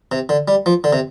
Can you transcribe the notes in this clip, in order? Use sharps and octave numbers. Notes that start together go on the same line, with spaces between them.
C3
D3
G3
F3
D3
C3